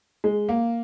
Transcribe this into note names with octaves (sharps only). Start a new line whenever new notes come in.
G#3
A#3